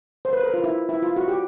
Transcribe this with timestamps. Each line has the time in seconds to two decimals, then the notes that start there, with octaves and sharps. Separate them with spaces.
0.25 C5
0.33 B4
0.43 A#4
0.54 F4
0.64 E4
0.89 E4
1.02 F4
1.16 F#4
1.28 G4